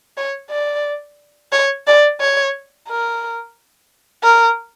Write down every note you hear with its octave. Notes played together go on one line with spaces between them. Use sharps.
C#5
D5
C#5
D5
C#5
A#4
A#4